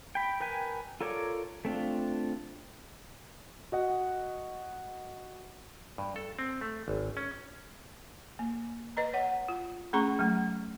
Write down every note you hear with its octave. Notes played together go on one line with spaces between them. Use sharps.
G5 B5
A#4 B4 G5 G#5
F4 A4 A#4 C#5 D5
A3 C4 D4 F4
F#4 D#5 F#5
G2
A4
C4
A3
G#1
C#4
A#3
B4 D#5 A#5
C#5 F#5
F4
A3 C#4 G#4 A#5 C#6
F#3 A3